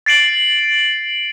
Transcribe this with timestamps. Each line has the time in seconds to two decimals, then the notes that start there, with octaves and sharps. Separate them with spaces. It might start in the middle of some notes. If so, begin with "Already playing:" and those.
0.06 A6 C7 D7 F#7